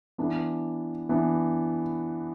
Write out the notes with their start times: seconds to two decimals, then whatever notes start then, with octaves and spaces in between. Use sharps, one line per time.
0.18 E3 B3 D4
1.09 E3 B3 D4